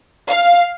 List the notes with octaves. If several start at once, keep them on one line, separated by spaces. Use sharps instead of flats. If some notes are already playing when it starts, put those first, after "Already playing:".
F5